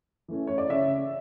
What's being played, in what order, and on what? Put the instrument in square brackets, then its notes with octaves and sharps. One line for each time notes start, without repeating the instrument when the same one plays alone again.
[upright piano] E3 A3 C#4
C#5
D5
C#3 E5